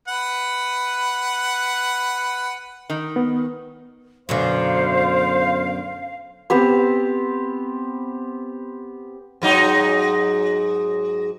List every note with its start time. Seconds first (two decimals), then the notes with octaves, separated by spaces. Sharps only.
0.08 B4 F#5
2.90 D#3
3.16 B3
4.29 F#2 B2 D3 C5 F5
6.50 B3 C4 G4 C5
9.42 G#2 F#3 D#4